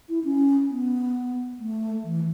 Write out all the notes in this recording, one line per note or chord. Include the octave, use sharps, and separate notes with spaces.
E4
C#4
B3
A3
E3